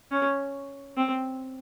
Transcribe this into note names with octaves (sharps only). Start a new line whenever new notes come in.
C#4
C4